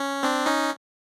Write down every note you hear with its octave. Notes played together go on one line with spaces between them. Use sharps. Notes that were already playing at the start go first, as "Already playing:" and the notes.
Already playing: C#4
C4 D4
C#4 D#4